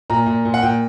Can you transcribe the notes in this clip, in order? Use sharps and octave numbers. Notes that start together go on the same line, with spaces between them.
A#2 A#5
A#2
A#2
F#5
A#2 G5